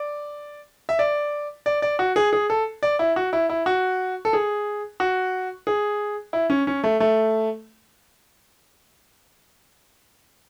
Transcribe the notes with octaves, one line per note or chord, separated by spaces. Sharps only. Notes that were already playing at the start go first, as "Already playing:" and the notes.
Already playing: D5
E5
D5
D5
D5
F#4
G#4
G#4
A4
D5
E4
F#4
E4
E4
F#4
A4
G#4
F#4
G#4
E4
C#4
C#4
A3
A3